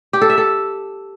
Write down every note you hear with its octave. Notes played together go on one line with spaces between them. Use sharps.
G4
A4
E5
A4